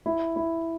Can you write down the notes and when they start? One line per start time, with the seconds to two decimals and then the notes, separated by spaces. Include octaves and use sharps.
0.06 E4
0.36 E4